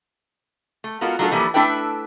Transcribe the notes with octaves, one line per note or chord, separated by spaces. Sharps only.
A3
G#3 B3 F4 F#4 A4 A#4
F#3 A3 D4 F4 A4 A#4
E3 F3 G3 A#3 A4 B4
A3 D4 E4 A4 B4 G5